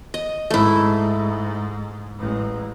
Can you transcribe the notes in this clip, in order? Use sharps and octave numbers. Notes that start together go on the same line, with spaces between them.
D#5
G#2 A3 E4
A1 G#3